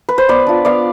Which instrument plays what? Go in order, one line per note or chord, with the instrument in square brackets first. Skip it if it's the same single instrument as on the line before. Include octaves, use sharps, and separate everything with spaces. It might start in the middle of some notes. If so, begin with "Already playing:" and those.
[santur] B4
C5
B3 B4 D5
D4 F4
B3 D5 F5